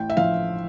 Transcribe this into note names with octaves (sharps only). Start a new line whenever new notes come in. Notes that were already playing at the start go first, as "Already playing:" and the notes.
Already playing: A1 G5
E5
A2 F3 F5